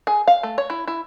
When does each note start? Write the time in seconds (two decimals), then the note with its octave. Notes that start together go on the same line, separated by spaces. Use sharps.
0.07 G#4
0.28 F5
0.43 A3
0.58 C#5
0.70 E4
0.87 E4